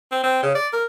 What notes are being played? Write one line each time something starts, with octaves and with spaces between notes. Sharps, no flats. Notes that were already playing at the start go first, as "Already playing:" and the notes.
C4
C4
C#3
D5
A#4